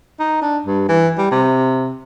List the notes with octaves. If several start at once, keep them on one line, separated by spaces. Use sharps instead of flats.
D#4
D4
G2
E3
G3
C3